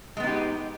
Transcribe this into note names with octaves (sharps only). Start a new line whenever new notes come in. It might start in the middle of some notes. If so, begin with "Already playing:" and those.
G#3 B3 D#4 G4